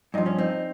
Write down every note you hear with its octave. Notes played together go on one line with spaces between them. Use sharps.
G2 F3 D#4
C#4
C4 D#4